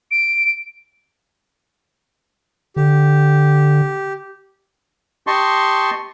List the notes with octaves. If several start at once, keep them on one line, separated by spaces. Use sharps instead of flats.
D7
D3 G4
G4 D#5 A5 C6 C#6